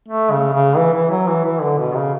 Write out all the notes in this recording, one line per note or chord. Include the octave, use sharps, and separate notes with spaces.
A3
C#3
C#3
E3
E3
F#3
E3
E3
D3
B2
C#3